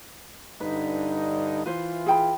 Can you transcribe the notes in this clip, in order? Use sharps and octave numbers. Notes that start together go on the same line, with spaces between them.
G2 D3 D#4 B4
E3 F4 B4 C5
G#4 G5 B5